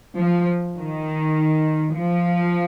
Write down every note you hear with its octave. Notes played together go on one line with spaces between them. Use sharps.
F3
D#3
F3